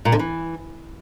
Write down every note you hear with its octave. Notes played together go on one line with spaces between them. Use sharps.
A#2
D3
E3